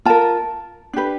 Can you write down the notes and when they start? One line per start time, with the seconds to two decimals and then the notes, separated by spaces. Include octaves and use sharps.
0.05 F4 A#4 A5
0.93 D4 G4 B4